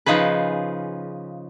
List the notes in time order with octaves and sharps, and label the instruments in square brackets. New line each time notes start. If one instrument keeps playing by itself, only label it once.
[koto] C#3 F3 D#4 G#4 B4